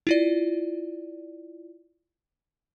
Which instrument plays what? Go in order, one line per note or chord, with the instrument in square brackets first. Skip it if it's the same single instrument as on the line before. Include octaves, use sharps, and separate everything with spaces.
[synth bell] E4 F4 D5